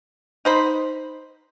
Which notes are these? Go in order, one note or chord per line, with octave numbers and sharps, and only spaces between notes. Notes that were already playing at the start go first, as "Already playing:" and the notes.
D#4 C5 B5